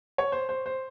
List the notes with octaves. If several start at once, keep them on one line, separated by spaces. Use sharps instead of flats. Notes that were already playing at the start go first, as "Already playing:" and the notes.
C#5
C5
C5
C5